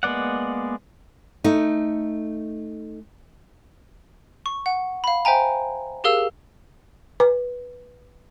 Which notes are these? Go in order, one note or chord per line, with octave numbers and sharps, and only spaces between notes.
G#3 A#3 B3 D5 F#5
A3 D#4
C#6
F#5
F5 B5
C5 E5 G5 G#5 A#5
G4 G#4 A#4 F5 E6
B4